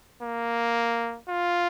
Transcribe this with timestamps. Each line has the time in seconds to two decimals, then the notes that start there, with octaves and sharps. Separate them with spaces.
0.22 A#3
1.29 F4